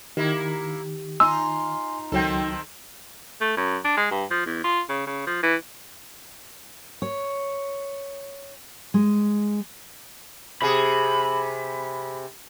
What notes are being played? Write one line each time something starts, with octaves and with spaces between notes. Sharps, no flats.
D#3 A#3 E4 G4
D#4 F4 G#5 C6 E6
C#2 D#3 F#3 C4 D#4 A4 G5
A3
F#2
D4
G#3
G2
F3
E2
F4
C#3
C#3
F3
E3
C#5
G#3
C3 G#4 B5